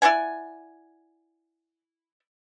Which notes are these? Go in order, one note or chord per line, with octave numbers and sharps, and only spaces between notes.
E4 D5 F#5 G#5